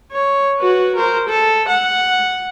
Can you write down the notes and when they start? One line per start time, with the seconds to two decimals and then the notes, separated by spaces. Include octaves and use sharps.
0.12 C#5
0.59 F#4 B4
0.96 A#4 C5
1.29 A4
1.68 F#5